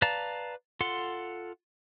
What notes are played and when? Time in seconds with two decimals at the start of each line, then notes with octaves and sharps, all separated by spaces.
0.02 B4 D5 F5 A5 A#5
0.80 F4 A4 F#5 C6